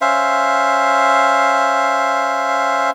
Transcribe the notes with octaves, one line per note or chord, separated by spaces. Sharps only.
C#4 C5 E5 F5